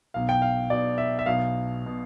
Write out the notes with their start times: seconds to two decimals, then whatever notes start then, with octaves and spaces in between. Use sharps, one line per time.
0.14 B1 B2 F5
0.29 G5
0.42 F5
0.70 B1 B2 D5
0.98 E5
1.19 E5
1.26 B1 B2 F5
1.86 B2